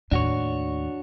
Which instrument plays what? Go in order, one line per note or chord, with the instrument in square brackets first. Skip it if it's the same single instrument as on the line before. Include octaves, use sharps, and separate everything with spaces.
[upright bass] D#2 A2 [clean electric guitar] D4 F#4 C#5